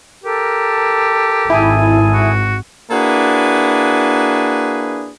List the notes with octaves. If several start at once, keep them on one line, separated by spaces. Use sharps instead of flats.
G4 A4 A#4
G#1 E4 G#4 A4 G#5
F#4
A#3 D4 E4 F#4 G#4 B4